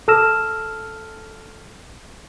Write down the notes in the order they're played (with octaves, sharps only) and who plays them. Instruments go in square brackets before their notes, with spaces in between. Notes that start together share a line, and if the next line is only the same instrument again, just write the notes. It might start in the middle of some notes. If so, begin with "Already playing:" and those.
[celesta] A4 A5 E6 F6 A#6 E7